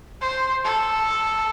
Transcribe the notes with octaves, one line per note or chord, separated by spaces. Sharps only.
C5
A4